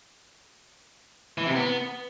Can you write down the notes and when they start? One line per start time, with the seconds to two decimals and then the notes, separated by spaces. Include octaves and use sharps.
1.38 E3
1.46 C3
1.55 B3